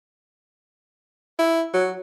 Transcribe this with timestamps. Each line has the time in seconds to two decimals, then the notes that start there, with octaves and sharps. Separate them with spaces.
1.39 E4
1.73 F#3